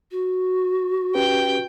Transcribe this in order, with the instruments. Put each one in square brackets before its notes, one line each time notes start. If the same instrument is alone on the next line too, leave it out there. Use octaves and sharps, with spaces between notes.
[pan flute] F#4
[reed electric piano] C#4 G4 B4 [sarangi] G5